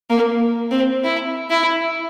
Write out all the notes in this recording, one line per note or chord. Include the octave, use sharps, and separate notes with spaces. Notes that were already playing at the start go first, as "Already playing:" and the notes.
A#3
C4
E4
E4